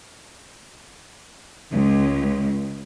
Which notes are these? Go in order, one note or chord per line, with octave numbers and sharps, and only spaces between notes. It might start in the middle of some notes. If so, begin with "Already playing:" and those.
C#2